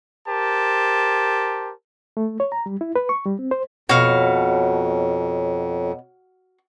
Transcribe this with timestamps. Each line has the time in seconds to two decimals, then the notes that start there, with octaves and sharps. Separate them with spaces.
0.28 G4 A#4 C5 A5
2.17 A3
2.40 C#5
2.52 A#5
2.66 G3
2.81 E4
2.96 B4
3.09 C#6
3.26 G3
3.39 C4
3.51 C5
3.89 F2 B2 F#4 C#5 F5